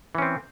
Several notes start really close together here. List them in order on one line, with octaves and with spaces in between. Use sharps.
E3 C#4 C4